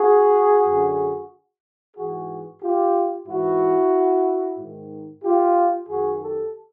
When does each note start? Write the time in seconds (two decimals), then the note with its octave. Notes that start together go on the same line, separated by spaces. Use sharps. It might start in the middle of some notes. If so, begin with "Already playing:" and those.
Already playing: F#4 G#4
0.65 F#2 D3
1.96 G#2 E3 F#4 G#4
2.62 F4 G4
3.27 G#2 E3 E4 F#4
4.59 G#2 D#3
5.23 F4 G4
5.89 F#2 D#3 F#4 G#4
6.21 G4 A4